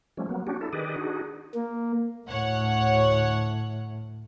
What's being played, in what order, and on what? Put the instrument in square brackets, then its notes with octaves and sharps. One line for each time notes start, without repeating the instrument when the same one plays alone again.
[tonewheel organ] F3 G3 A3 C#4
F#3 A#3 B3
C#4 D4 F#4 G4
D4 E4 A4
D#3 G4 G#4 B4 D5 D#5
D4 D#4 F#4 G#4
[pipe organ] A#3
[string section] D2 C#5 F#5 [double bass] A2